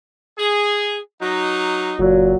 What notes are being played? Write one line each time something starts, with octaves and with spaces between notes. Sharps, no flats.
G#4
F#3 D#4
F#1 A#2 F#3